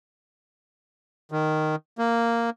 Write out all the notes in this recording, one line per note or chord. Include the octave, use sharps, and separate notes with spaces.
D#3
A#3